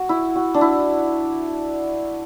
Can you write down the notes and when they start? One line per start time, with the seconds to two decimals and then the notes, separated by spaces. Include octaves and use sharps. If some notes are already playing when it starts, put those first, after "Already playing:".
Already playing: F#4
0.09 E4
0.36 F#4
0.54 D4
0.61 E4